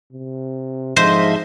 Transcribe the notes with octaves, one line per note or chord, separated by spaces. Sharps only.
C3
G#2 F3 C5 D#5 E5